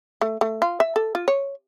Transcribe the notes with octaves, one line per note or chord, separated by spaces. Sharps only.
A3
A3
F4
E5
A4
F4
C#5